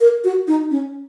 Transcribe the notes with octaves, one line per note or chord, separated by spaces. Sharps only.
A#4
F#4
D#4
C#4